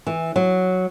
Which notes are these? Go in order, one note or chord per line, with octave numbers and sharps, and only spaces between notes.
E3
F#3